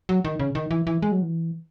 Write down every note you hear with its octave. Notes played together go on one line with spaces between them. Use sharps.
F#3
D#3
C#3
D#3
E3
E3
G#3
F#3
E3